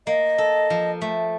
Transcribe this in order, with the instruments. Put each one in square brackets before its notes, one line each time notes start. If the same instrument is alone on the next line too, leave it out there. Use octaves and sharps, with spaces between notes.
[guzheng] A#3 [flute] D#5
[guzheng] A4
F3
A3